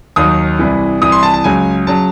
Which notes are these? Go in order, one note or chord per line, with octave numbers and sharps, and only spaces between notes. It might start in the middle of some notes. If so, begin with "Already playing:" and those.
D#2 D#3 F#3 D#6
C2 C3 E3
C2 C3 E3 D#6
C6
A5
A5
C#2 C#3 F#3 G#5
C#3 F#3 A5